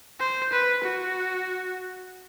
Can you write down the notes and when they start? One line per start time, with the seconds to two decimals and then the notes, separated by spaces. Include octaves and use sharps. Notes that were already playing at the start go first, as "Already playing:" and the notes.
0.20 C5
0.52 B4
0.84 F#4